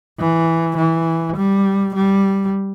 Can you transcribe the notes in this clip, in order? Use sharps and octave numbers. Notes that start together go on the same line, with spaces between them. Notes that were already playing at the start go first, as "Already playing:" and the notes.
E3
E3
G3
G3